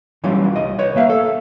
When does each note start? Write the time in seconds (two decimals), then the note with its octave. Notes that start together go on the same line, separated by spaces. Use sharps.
0.24 E3 F#3 G3 C#4 F4
0.55 C2 D#5
0.79 B4 C#5
0.96 A#3 E5 F5
1.10 A4